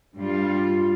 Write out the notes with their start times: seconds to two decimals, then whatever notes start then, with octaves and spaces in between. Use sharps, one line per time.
0.15 G2 G3 F4